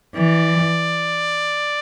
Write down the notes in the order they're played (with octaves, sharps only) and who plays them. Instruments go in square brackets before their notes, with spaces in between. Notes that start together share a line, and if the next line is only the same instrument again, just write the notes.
[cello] E3 [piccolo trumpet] D5